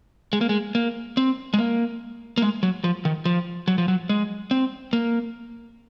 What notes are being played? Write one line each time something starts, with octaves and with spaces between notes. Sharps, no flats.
G#3
A#3
G#3
A#3
C4
G#3
A#3
A#3
G#3
F#3
F3
D#3
F3
F#3
F3
F#3
G#3
C4
A#3